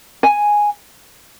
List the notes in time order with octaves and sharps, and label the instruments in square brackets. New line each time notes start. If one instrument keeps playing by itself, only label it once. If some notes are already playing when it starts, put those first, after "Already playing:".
[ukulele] G#5